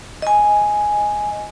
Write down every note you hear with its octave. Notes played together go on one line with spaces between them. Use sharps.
D#5 G#5